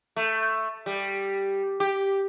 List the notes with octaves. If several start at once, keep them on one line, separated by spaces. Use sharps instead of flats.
A3
G3
G4